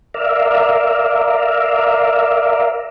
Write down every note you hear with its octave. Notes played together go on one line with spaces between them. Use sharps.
A#4 D5 E5 F5